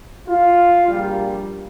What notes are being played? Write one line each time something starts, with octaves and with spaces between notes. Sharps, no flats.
F4
A#1 A#2 G3 A#3